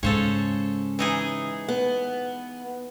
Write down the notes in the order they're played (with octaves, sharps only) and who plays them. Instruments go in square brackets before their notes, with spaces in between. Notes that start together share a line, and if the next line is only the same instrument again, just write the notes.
[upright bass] G#2 G#3 [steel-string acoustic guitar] C#3 [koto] A4 C5 C#5
[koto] E3 D#4 G#4
[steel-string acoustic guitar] B3